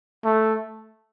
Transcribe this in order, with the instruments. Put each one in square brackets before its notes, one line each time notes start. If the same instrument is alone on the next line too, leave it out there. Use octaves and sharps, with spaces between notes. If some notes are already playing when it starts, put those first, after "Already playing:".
[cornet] A3